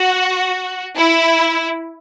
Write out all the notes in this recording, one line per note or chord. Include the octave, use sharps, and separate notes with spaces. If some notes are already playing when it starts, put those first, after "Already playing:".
Already playing: F#4
E4